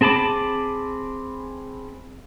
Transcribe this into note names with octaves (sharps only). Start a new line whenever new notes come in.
C4 G#4 A5 B5 D6